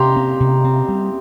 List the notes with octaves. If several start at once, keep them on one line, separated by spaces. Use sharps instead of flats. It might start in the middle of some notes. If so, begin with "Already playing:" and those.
Already playing: C3 G4 A#5 C6
C4
C3
C4
G3